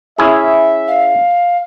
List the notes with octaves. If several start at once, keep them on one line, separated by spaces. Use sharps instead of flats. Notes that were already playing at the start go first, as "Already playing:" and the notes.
C#4 E4 G#4 E5
F5